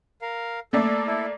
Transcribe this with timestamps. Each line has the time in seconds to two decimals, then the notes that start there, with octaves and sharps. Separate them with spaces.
0.22 A#4 F5
0.73 A3 A#3 A4 D5
1.07 E4 A4